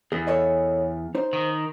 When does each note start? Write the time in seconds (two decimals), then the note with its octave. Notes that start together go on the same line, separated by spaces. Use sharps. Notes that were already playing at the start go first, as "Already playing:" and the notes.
0.12 E2 G#4
0.27 A4 C#5 D#5
1.15 D#4 C5
1.33 D#3